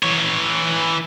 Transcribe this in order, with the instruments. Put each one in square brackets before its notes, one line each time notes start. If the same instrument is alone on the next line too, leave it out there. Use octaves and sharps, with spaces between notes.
[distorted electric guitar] E3 C#5